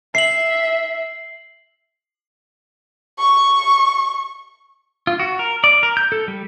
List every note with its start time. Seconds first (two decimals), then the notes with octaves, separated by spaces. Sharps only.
0.15 E5 C7 F#7
3.19 C#6
5.07 F4
5.20 F#4
5.39 A#4
5.64 D5
5.83 A#4
5.97 G6
6.12 A4
6.28 G3